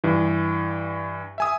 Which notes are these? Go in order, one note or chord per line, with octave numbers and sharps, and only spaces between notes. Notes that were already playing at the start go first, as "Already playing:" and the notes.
G2 E3
E5 G#5 D#6